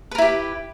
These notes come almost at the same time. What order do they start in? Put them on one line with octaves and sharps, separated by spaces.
B4 A#4 E4 G4